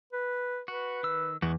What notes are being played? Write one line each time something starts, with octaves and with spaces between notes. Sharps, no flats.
B4
F#4 B4
D#3 E6
E2 G#3 F#4